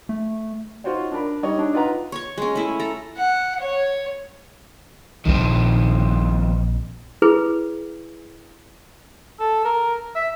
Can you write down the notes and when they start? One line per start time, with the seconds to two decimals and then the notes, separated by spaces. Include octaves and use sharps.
0.09 A3
0.84 D#4 F4 F#4 C5 C#5
1.12 D4 A#4 D5 B5
1.43 G3 D#4 C#5 C#6
1.58 D4
1.73 D#4 F4 B4 F#5 A#5
2.12 C#5 C#6
2.38 G#3 C#4
2.55 A3 E4
2.80 A4 A#5
3.17 F#5
3.60 C#5
5.25 A#1 A#2 D#3 F3 C4
7.22 E4 G#4 B4
9.40 A4
9.65 A#4
10.15 E5